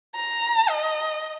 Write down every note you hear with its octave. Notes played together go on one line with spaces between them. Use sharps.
A#5
D#5